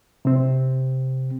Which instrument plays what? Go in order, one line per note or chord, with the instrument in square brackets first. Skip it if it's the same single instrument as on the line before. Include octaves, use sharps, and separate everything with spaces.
[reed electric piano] C3 C4